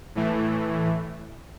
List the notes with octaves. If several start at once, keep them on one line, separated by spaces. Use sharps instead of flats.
A2 E3 A3